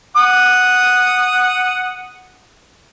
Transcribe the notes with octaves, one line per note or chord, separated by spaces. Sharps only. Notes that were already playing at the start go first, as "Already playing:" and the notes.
F#5 D#6